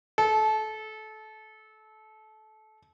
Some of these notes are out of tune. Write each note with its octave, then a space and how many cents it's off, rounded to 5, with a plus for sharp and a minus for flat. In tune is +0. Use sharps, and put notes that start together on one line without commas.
A4 -25